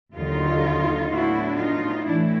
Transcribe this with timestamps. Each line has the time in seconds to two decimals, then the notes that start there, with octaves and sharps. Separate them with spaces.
0.14 D#2 D3 F#3 D#4 F4
1.10 A2 F#3 B3 D4 E4 F#4
1.58 D#4 F4
2.06 A2 E3 A3 D4 E4